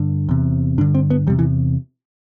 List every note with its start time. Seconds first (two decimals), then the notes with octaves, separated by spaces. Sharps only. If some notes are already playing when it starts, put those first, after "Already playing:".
Already playing: G2 D3
0.29 E2 C3
0.78 G2 D4
0.81 D3
0.94 C4
1.10 B3
1.27 E2 C3 G3
1.39 E3